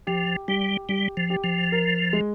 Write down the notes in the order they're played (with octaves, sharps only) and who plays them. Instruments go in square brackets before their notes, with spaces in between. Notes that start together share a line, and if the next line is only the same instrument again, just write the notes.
[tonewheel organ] F3 [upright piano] G4
[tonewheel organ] G3 [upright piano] G4
[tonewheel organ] G3 [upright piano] G4
[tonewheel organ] F3
[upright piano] G4
[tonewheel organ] F3
[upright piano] A#4
G#3